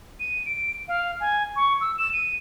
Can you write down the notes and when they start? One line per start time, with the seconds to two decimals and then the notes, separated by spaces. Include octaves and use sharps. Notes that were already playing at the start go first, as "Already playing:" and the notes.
0.20 D#7
0.46 D7
0.88 F5
1.20 G#5
1.56 C#6
1.81 E6
1.98 E7
2.13 D#7